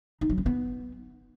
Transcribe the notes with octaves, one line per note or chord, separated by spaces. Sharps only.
D#4
F#3
C#4
B3